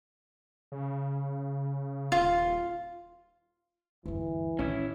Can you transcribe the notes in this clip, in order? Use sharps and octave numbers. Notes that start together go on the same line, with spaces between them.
C#3
D#1 F4
D2 G2 E3
A2 D#3 C#4 E4